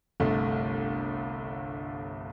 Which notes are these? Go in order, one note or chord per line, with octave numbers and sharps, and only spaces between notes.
G1 C2 A3